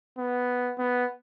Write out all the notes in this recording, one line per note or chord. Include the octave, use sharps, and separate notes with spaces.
B3
B3